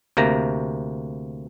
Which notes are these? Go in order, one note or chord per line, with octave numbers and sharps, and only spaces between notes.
D2 C3 A#3 A#5